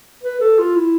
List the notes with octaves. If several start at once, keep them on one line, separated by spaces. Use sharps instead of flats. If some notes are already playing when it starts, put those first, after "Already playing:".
B4
A4
F4
E4